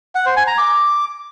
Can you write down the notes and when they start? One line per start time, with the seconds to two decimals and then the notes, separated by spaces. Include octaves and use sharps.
0.15 F#5
0.26 C5
0.37 G#5
0.47 A#5
0.58 D6